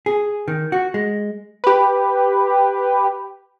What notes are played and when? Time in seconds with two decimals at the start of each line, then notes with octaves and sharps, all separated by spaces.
0.06 G#4
0.48 D#3
0.72 F#4
0.94 G#3
1.64 G4 B4